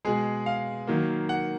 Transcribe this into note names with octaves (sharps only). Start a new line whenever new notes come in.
B2 G#3 G#4
F5
D#3 F#3 A#3
F#5